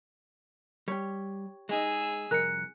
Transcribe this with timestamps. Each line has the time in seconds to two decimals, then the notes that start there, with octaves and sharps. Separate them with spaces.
0.88 G3 G4 C#5
1.69 G#3 D#4 G#4 E6
2.31 C2 F2 A#4 F#6 C#7